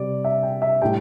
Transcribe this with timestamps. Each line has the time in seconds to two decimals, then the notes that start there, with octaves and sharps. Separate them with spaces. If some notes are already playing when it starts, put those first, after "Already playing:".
Already playing: C3 G3 D5
0.25 E5
0.43 G5
0.62 E5
0.82 A2 G3 G5